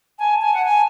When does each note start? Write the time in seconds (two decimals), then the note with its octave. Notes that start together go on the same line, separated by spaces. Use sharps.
0.19 G#5 A5
0.41 G#5
0.54 F#5
0.65 G#5